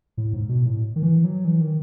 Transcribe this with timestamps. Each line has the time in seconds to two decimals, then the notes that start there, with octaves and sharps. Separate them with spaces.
0.17 A2
0.33 G#2
0.49 B2
0.66 A2
0.96 D#3
1.02 E3
1.24 F#3
1.45 E3
1.61 D#3